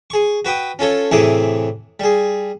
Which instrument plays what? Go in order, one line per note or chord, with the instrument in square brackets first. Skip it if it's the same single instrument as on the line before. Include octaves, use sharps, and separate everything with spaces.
[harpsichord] G#4 C#6
F#4 B4 G5 D#6
C#4 F4 A4 C#5
A2 C3 E3 G#4 D6
G3 G#4